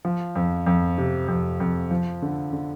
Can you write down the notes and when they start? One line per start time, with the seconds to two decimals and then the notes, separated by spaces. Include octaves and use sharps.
0.05 F3
0.36 F2
0.67 F2
0.98 C3
1.28 F2
1.60 F2
1.91 F3
2.22 D3
2.53 D3